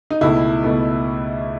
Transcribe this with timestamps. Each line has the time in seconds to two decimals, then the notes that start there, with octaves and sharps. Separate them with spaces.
0.10 D#4
0.21 C#2 B2 A3 E4
0.63 C#2 B2 A3